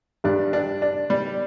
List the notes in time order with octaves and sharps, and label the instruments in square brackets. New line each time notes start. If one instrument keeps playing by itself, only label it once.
[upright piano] G2 G3 [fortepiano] D4
[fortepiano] D4
D4
G3